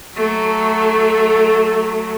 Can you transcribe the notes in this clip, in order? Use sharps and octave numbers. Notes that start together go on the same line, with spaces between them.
F#3 A3